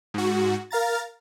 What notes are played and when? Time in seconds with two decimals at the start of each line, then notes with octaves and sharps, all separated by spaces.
0.14 G#2 F#4
0.71 A#4 F5 A#5 A6